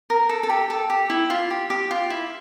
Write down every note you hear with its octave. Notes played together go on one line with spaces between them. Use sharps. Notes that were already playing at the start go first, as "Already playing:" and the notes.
A#4
A4
A4
G4
A4
G4
E4
F4
G4
G4
F4
E4